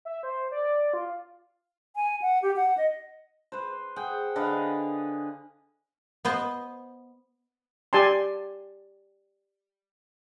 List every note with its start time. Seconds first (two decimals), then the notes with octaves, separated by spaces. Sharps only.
0.05 E5
0.23 C5
0.51 D5
0.94 F4
1.96 G#5
2.22 F#5
2.42 G4
2.56 F#5
2.77 D#5
3.52 B4 C5
3.96 G#4 F#5 G5
4.36 D3 B4 D#5 F5
6.25 B3 C5 D#5
7.93 G4 D5 G#5 A5 C6